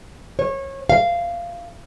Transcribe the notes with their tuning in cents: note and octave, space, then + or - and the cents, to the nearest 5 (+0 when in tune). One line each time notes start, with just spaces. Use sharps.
C#5 -25
F5 -15